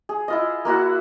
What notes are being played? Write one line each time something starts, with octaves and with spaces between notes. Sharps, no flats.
G#4
E4 F4 D#5
A#3 E4 F#4 F#5